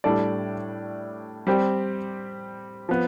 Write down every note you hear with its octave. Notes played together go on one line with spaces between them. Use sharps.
A2 G3 D4 A4 D5
G3 C4 G4
F3 B3